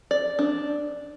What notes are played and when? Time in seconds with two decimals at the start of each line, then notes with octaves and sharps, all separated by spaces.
0.11 D5
0.39 D4